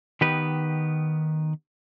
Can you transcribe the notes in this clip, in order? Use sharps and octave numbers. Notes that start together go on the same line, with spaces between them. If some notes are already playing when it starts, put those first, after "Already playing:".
D#3 B3 G4 B4